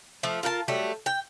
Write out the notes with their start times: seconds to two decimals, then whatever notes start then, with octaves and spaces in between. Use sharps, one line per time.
0.23 F3 A3
0.43 F4 A#4 G5 A5
0.68 F#3 G3 A3
1.06 G5